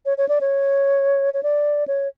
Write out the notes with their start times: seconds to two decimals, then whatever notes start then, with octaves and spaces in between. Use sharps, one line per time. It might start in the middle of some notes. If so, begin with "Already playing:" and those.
0.06 C#5
0.18 C#5
0.29 D5
0.41 C#5
1.34 C#5
1.43 D5
1.88 C#5